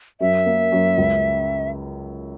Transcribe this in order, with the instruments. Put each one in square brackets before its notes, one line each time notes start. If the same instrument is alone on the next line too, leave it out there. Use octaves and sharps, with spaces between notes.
[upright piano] F#2 [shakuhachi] E5
[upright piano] A#3
F#2
C#2